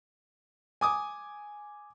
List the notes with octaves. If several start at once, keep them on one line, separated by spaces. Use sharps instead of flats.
G#5 D6 D#6